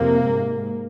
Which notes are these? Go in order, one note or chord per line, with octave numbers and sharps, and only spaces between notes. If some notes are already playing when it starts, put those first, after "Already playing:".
Already playing: F2 C3 A#3
G#2